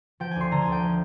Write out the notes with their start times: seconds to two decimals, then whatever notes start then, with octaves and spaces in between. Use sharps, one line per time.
0.20 F3 G5
0.31 D2 G#5
0.41 C6
0.51 D3 A#5
0.62 G#5
0.68 D2 G5
0.82 F3